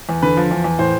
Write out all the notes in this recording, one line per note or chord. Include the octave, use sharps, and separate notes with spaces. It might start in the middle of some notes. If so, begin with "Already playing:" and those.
E2
D3 B4
F3
E2
E2
A2 C5